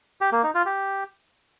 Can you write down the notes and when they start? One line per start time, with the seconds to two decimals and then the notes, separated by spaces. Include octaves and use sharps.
0.21 G4
0.32 A#3
0.43 D#4
0.55 F4
0.66 G4